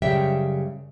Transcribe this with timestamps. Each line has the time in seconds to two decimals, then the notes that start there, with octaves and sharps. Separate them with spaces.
0.02 F#2 C#3 G3 E5 G5